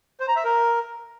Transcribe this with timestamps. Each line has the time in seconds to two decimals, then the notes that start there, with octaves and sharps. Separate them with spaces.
0.20 C5
0.28 A#5
0.36 E5
0.44 A#4